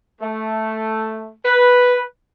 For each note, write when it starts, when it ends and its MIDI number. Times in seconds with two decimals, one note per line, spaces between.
0.21 1.33 57
1.45 2.02 71